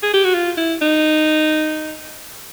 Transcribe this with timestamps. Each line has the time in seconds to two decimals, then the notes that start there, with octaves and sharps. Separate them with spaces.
0.03 G#4
0.14 G4
0.24 F#4
0.34 F4
0.58 E4
0.82 D#4